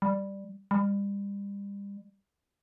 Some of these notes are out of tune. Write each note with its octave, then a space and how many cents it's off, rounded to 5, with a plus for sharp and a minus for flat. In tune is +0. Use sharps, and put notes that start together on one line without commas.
G3 +5
G3 +35